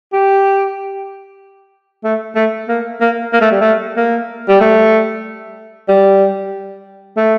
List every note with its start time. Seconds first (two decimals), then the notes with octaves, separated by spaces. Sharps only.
0.13 G4
2.04 A3
2.35 A3
2.68 A#3
3.01 A#3
3.33 A#3
3.41 A3
3.51 G3
3.61 A3
3.96 A#3
4.48 G3
4.60 A3
5.88 G3
7.17 A3